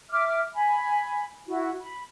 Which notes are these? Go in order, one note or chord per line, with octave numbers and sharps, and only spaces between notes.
E5 D6 F6
G#5 B5
E4 F#4
B5